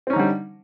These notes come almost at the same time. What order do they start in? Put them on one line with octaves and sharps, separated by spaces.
C4 C#4 D#4 D3 G3